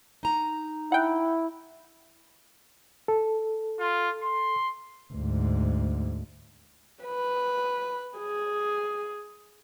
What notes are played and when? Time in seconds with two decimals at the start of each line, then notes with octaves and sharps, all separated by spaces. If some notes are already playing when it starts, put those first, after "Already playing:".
0.23 D#4 A#5
0.92 E4 F#5 G5
3.08 A4
3.80 F4
4.22 C6
5.13 D2 G#2
7.04 B4
8.18 G#4